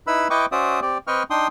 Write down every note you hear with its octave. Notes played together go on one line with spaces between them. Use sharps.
D#4 E4 B4 B5 E6
E4 B4 D#5 G5 C#6 D6
C#4 F#4 C5 D5 E5 D#6
C4 G4 D5
C4 B4 D#5 G5 C#6 F6
D4 D#4 G5 C6 D#6